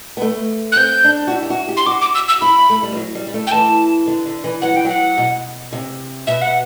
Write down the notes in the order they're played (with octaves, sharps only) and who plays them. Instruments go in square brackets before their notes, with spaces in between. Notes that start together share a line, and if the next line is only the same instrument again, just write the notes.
[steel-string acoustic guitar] B3
A3
[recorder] F#6
[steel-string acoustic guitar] C4 [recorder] G6
[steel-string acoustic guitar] D4
F#4
E4
G4
F#4
G4
[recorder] C6
[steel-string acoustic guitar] F#4 [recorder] D6
[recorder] D6
E6
E6
[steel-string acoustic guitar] E4 [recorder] B5
[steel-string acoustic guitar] A3
G3
E3
F#3
G3
G3
A3
[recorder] G5
[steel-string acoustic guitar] E3 [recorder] A5
[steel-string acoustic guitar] D3
D3
E3
[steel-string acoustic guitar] F#3 [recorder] F#5
[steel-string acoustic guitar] E3 [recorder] G5
[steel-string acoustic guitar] F#3 [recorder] F#5
[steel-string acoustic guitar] B2
C3
[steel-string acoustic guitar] B2 [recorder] E5
[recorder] F#5